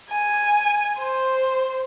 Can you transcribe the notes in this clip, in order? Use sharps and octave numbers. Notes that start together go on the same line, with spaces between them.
G#5
C5